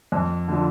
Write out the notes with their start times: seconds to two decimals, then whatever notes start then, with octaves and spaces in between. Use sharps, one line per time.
0.12 F2
0.48 D3 F3